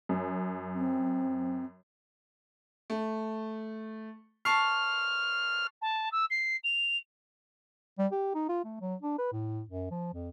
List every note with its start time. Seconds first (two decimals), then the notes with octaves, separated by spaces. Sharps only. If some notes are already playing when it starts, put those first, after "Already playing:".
0.09 F#2
0.74 C4
2.90 A3
4.45 A5 C#6 F6 C7
5.81 A5
6.11 E6
6.30 C7
6.63 F7
7.99 G3
8.12 G4
8.35 D#4
8.49 F4
8.65 A3
8.81 F#3
9.02 D4
9.18 B4
9.32 A2
9.69 F#2
9.91 F3
10.14 F2